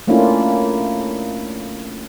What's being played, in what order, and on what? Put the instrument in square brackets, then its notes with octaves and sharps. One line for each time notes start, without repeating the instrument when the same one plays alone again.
[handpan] A3 A#3 C#4 D4 E4 F4